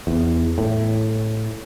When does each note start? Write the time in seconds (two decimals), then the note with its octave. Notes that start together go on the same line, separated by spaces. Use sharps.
0.07 E2
0.58 A2